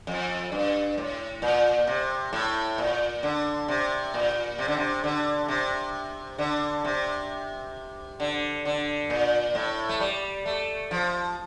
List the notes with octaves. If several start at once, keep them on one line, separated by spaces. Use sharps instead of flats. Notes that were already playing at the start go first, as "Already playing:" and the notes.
F2
G2
A2
A#2
C3
A2
A#2
D3
C3
A#2
C3
D3
C3
D3
C3
D3
C3
D3
D3
A#2
A2
A3
G3
A3
F3